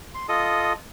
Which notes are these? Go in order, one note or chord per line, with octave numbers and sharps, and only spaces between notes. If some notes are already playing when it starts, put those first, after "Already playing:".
C6
F4 A4 D#5 D#6